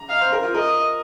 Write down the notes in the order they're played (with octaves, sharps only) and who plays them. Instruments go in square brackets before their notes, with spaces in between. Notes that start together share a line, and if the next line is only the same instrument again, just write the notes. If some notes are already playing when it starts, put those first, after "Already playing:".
Already playing: [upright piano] A#5
[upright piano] D#5 [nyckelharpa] F5
[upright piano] C5
A#4
F4
[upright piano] A#4 [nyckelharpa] D#5